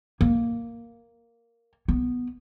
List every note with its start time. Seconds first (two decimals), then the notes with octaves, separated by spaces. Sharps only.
0.21 A#3
1.88 B3